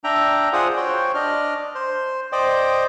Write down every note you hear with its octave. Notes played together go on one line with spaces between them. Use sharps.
D4 E5 G5 A#5
F4 G#4 C5 D5 F#5 D#6
F#4 C5 C#5 G5
D4 D5 D#5 F6
C5
C5 D5 D#5 G5